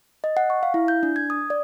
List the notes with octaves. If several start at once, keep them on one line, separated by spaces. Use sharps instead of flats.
D#5
F#5
C#6
F5
E4
G6
D4
G#6
D#6
D5